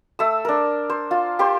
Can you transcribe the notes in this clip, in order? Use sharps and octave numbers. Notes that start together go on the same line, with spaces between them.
A3 E6
D4 A#4
C5
F4
G4 C5 C6